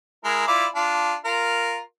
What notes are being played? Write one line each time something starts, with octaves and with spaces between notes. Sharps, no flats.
G#3 E4 A#4
E4 F4 D5
D4 F4
F4 A#4